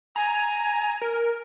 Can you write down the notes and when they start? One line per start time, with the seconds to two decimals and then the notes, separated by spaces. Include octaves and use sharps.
0.16 G#5 A#5
1.01 A#4